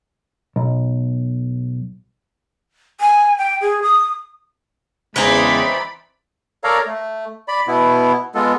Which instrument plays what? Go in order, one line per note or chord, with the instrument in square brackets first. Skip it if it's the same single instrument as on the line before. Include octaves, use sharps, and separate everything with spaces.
[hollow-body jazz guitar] B1
[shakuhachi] G#5
G5
G#4
D#6
[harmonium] E2 C#3 [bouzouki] E3 C4 D#4 [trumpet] G#3 [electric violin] D5 B5
[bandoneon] A4 A#4 C#5 D5 F5 A#5
A3
D5 B5
B2 B3 E4
G#3 B3 F4 A4